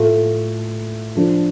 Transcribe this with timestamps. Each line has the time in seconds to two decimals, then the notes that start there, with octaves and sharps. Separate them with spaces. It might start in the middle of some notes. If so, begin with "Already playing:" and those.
Already playing: A2 A3 F4
1.15 F3 D4 F4